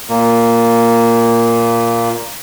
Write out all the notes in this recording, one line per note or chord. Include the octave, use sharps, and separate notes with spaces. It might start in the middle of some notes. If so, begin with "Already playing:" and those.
A#2 A#3